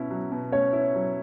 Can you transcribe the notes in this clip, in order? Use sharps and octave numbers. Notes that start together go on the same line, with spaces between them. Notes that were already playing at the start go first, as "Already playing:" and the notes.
Already playing: B2 C#4 E4
F#3
B2
C#4 C#5
E4
F#3